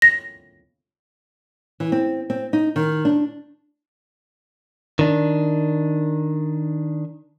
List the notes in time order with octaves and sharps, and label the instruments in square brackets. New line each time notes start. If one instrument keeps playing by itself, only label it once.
[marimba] A#6
[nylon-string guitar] E3
C4
C4
D#4
D#3
D4
[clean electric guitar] D#3 D4